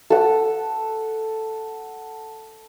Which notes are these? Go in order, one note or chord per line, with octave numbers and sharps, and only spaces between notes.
A4 F#5